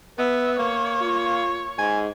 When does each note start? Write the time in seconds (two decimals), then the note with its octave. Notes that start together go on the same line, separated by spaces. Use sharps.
0.19 B3 B4 E5
0.59 A#3 C#5
1.01 F4
1.78 G#2 G#5